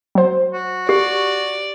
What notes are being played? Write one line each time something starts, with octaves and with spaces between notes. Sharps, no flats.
F#3 C5
F#4
G4 D5